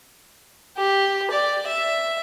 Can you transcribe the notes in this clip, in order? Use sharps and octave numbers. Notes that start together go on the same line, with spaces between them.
G4
D5
E5